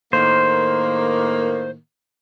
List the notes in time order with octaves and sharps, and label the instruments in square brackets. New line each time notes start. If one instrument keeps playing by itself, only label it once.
[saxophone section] A2 D#3 A#3 [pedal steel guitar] C5